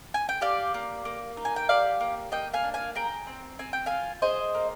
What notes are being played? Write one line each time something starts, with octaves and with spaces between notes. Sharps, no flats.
G#5
G5
G4 D5 F5
A#3
A#3
D#4
G#5
G5
G4 D5 F5
A#3
A#3 D#5 G5
F5 G#5
D4
F5 G#5
G#4 G5 A#5
C4
C4 G#5
G5
F4 F5 G#5
G#4 C5 D#5
A#3